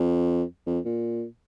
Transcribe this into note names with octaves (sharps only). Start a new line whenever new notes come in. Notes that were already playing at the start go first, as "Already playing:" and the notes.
Already playing: F2
F2
A#2